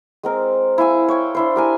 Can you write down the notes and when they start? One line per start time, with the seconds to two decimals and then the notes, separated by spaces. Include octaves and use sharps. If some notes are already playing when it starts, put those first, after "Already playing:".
0.23 G#3 C4 A#4
0.78 E4 F5 G#5 E6
1.08 C#5 G5
1.35 D4 E4 C5
1.56 G4 A#4 G#5